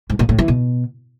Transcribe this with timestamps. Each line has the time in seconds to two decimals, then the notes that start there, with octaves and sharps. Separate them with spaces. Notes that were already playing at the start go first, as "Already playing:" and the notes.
0.10 G#2
0.19 A#2
0.29 A2
0.38 E3
0.48 B2